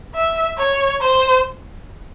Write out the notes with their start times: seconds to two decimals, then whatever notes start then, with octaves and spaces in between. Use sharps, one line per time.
0.15 E5
0.58 C#5
1.01 C5